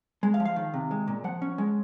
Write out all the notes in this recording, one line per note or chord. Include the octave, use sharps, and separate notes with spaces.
G#3
F5
F3
F5
D#3
C3
G#3
A#2
F3 F#5
C#4
G#3